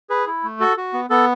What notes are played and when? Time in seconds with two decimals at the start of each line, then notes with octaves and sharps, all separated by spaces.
0.10 G#4 B4
0.27 E4
0.43 A3
0.60 F#4 A4
0.77 F#4
0.93 B3
1.10 B3 A4